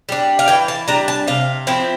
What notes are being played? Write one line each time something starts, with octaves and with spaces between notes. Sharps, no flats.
G3 D4
F5
E3 G5
A5
G3 D4 A#5
A5
C3 F5
F3 C4 E4